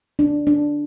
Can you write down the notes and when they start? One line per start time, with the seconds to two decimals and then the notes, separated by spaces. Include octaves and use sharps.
0.19 D4
0.47 D4